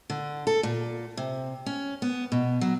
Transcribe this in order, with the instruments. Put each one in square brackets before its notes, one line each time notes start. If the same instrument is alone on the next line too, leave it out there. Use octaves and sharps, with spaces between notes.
[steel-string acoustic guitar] D3
A4
A#2
C3
C#4
B3
B2
F#3